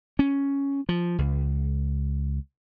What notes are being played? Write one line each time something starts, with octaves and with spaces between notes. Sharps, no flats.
C#4
F3
C#2